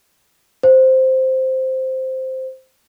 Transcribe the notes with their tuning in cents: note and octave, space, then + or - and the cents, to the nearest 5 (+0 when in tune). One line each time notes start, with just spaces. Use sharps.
C5 +0